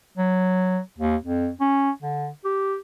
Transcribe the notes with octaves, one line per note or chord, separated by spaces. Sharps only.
F#3
D#2
F2
C#4
D3
G4